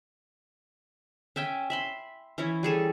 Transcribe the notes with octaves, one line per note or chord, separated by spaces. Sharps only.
C#4 E5 G5 G#5
E5 B5 C6
E3 C#4 E4 C#5
G3 G#4 A4 C#5